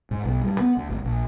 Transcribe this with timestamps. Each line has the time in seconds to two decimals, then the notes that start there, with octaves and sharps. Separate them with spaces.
0.11 G#2
0.24 B1
0.42 G2
0.60 B3
0.77 D2
0.89 G#1
1.05 A#1